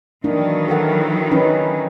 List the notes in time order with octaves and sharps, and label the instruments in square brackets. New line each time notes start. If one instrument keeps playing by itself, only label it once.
[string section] D#3 E3 F#3 [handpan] A#3 D4 D#4
[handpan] A4 A#4 F#5
C#4 D#4 B4